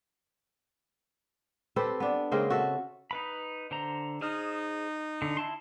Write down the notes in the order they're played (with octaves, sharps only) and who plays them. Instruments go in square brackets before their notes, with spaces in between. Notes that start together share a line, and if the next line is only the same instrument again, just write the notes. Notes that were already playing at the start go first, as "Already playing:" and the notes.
[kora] C4 G4 A4 B4
B3 D4
C#3 G#3 A#3 C4
F#4 A4 E5
[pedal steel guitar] D#4 B4 B5
D3 C5 A#5
[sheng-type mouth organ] D#4 [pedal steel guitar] G#4 C5 F6
[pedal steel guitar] D3
E4 A5 C6